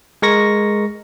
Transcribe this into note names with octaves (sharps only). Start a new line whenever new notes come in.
G#3 A#4 C#6 A#6